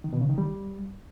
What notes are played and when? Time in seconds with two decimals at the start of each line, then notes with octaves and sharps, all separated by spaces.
0.04 D#3
0.13 B2
0.21 C#3
0.29 D#3
0.38 G3